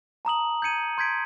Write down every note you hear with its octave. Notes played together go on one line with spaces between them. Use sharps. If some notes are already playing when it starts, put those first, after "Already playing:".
A5 A#5 D#6 F#7
G6 G#6 C#7 D#7
C6 G6 G#6 B6 D7